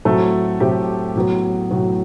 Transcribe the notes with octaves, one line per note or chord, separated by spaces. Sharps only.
A2 F#3 A3 C4 A4
A2 F#3 A3 C4 G4
A2 F#3 B3
A2 F#3 B3